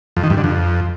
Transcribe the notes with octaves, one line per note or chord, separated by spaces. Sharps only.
F2
D#3
G2
D3
F2